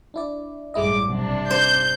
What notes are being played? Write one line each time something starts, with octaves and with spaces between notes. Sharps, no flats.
D4 E4 D5
A1 G2 G#3 E4 D#5 D6
B1 C3 D4
C5 D5 G6